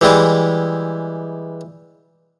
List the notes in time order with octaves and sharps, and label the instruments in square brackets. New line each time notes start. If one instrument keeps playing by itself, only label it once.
[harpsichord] E3 G3 G#3 E4